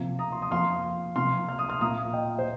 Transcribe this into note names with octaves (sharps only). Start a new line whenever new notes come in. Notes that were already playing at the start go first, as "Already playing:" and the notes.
Already playing: C3 F3 A#3
A#5 D#6
C6
D#6
F2 F3 A#3 C6 F6
C3 F3 A#3 C6 F6
F6
D#6
C6 F6
A#2 A#3 A#5 D#6
D#5 G5
C5